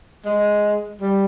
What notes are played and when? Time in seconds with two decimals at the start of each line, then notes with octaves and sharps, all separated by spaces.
0.25 G#3
1.01 G3